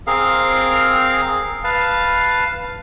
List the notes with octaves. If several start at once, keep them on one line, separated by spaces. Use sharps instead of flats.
C4 G#4 A#4 F5
B4 F5 A5